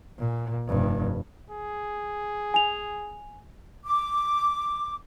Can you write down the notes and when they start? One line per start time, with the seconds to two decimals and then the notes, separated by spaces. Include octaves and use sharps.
0.19 A#2
0.67 F1 G2
1.50 G#4
2.54 G#5 F7
3.86 D6